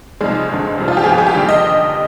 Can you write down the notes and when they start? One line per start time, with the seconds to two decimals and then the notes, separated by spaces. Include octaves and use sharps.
0.21 F2 C3 D#3 G3 G#3
0.49 G#1 G2 D3
0.78 F1 F2 C3 G3
0.88 F4
0.97 G4
1.04 G1 G2 F3 G#4
1.12 G4
1.18 G#4
1.27 G4
1.34 F1 D#2 D3 G3
1.49 D#5